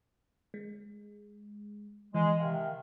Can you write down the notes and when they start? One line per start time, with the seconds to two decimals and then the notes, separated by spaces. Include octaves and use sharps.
0.54 G#3
2.14 E3 G#3
2.40 C3 D#3 F5